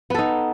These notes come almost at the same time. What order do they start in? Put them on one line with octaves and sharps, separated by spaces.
B3 A4 D#4